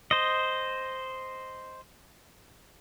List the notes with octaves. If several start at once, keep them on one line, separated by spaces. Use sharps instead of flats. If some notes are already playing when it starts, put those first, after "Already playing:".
C5 D#5